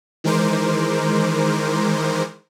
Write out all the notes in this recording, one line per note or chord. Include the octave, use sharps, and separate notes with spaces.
D#3 E3 G#3 A#4 C5 D6